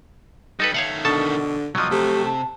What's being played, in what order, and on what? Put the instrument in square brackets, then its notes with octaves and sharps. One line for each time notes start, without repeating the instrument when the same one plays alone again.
[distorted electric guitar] G3 [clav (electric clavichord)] D#4 A4 B4
[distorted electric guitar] D#3 A3 [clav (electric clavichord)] C#5 F5 F#5
[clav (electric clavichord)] B2 A4 A5 [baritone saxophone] D3
[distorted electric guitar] C2 D#5 [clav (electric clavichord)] F3 F#3
[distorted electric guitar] C3 [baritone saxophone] A3 [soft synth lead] G4
[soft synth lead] A5